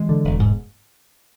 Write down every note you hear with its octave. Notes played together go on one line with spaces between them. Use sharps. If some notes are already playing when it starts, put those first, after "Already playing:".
Already playing: E3 G#3
D3
E1
G#2